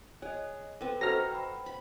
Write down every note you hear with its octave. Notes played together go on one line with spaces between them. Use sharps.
G#4 C#5 D#5
C4 A4 B4
F#4 A4 C5 D#5 A#5 F6 A#6
G5 B5
B5